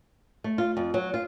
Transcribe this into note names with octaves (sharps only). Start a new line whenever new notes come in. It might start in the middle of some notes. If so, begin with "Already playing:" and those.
A3
F4
F2
F#3
F4